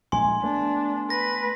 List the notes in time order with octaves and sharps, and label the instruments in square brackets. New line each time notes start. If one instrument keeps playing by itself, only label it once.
[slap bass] A#1 G#3 [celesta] G#5 [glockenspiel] C6
[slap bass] A3 B3 [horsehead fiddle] D4
[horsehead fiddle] B4 [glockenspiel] A#6